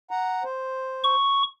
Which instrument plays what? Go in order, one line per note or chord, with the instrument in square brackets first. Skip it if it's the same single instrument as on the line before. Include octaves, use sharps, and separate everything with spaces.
[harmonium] F#5 A#5
C5
[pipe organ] C#6